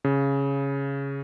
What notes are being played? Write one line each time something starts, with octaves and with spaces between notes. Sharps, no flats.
C#3